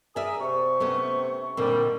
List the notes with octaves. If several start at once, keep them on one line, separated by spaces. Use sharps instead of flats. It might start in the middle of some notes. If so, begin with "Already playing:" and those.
G#4 A#4 D5 E5 D#6
C3 C#6
A3 B3 C#4
A#2 D3 D#3 G3 C4